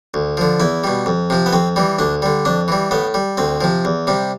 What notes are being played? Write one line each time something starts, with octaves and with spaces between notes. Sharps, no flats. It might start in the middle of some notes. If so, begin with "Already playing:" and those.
D2
D3 F3
E2 E4
B2 G3
F2
C3 F3
B3
F2 C4
E3 G3
D2 D4
D3 G3
F2 D4
E3 G3
A2 B3
G3
D2 C4
C3 F3
E2
C3 G3